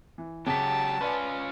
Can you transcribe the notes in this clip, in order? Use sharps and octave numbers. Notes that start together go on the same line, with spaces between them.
E3
C#3 F#3 G4 A5 B6
C#4 F4 B4 D5 G#5